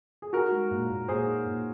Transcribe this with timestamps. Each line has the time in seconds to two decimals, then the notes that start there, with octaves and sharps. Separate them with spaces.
0.22 G#4
0.33 D#4 F#4 A#4
0.52 G#3
0.71 A#2
0.90 A#2
1.08 A#2 G#4 C5
1.27 D#4
1.46 A#2